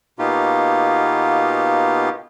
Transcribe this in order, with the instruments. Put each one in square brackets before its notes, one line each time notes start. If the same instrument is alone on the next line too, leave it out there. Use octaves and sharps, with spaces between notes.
[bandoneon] B2 A#3 B3 D#4 F4 G4